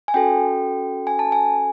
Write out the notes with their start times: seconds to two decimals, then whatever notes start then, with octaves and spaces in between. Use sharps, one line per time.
0.08 G#5
0.14 C#4 F#4 A4 G5
1.07 G#5
1.19 A5
1.32 G#5